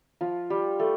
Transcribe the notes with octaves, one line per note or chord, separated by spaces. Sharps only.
F3 F4
G3 G4
A3 A4